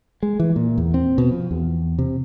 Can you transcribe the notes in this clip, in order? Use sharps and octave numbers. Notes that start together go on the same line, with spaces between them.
G#3
E3
A#2
E2
C4
B2
F3
E2
C3